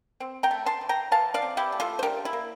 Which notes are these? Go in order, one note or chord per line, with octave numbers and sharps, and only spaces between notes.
C4
G5 A#5
A3
A5 C6
E3
G5 A#5
E3 F5 A5
D5 F5
C4
E4 G4
A3
F4 A4
C5
D4 G4 A#4
E4
A#3